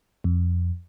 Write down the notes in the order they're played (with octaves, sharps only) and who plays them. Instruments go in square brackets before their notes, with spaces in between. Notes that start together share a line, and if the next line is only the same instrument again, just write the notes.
[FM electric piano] F2